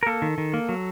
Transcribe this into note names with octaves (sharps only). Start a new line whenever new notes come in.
A#4
A#3 A4
D#3
D#3
A#3
F#3